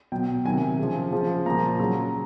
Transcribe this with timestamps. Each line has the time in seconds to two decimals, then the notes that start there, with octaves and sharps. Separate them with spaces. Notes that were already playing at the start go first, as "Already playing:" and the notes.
0.12 B2 F#3 G5
0.45 C3 D#3 F#3 G#5
0.79 C#3 F3
1.12 C#3 F3
1.46 A#2 F3 A#5
1.79 C#3 F#3